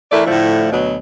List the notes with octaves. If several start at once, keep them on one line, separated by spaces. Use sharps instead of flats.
E3 A3 E4 A#4 D5
A2 D3 F3 A3 E4
D2 B2 F#3 B3